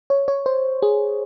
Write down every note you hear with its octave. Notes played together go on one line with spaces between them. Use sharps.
C#5
C#5
C5
G#4